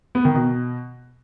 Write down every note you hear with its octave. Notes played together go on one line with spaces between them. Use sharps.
B3
D#3
B2